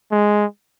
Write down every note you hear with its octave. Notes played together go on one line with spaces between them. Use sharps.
G#3